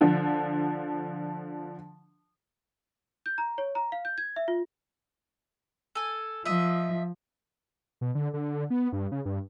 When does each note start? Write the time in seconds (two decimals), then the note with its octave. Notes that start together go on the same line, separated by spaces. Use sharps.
0.01 D3 F3
3.26 G6
3.38 A#5
3.58 C#5
3.75 A#5
3.92 F5
4.05 G6
4.18 G#6
4.36 E5
4.48 F4
5.95 A4 G#5
6.45 F3 D#5 E5
8.01 B2
8.15 D3
8.34 D3
8.70 B3
8.93 G2
9.12 C#3
9.25 G2